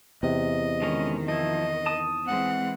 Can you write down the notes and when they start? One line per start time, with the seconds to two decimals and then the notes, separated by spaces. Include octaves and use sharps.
0.23 E2 C3 D#5
0.82 D3 D#3 G#3 C#4
1.28 F3 E4 D#5
1.86 A5 D#6
2.27 E3 G#3 C4 F#5